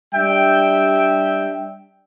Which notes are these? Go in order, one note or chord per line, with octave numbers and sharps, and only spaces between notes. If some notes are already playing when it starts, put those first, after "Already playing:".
G3 D4 E5 G5